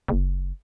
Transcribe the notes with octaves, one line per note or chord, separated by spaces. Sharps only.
F#1